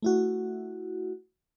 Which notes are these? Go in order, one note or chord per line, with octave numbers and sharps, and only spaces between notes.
A3 E4 F#4